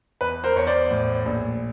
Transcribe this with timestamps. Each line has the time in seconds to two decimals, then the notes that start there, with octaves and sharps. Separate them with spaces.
0.21 E2 B4
0.44 A#4 C5
0.56 E2 C#5
0.67 C5 D5
0.91 A2
1.26 A#1